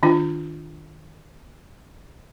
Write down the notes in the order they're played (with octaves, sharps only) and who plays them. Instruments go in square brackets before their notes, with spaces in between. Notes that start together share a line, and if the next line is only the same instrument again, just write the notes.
[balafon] D#3 D4 F4